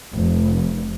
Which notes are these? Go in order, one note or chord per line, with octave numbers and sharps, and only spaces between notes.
F1